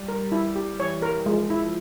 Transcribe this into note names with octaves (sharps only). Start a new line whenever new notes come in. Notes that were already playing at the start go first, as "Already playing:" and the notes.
Already playing: G3
A#4
G3 E4
G4
E3 C#5
A#4
F3 G#3
E4